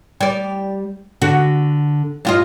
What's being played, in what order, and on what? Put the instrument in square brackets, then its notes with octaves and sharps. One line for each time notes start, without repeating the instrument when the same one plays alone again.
[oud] G3 D5
[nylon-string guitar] D3 [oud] F#4
[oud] G2 F4 D#5